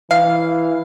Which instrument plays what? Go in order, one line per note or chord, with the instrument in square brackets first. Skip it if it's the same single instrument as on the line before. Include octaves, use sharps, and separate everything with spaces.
[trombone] E3 [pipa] F5